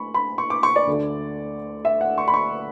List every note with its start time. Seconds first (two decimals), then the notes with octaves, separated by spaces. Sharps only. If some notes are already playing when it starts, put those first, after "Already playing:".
Already playing: A3 B5 C#6
0.14 B5
0.38 C#6
0.50 D6
0.63 C#6
0.76 D5
0.87 D2 D3 A3
1.85 E5
2.01 F#5
2.18 C#6
2.28 B5
2.34 C#6